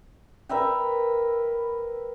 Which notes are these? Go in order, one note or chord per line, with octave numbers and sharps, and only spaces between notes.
A#4 B4 E5 G5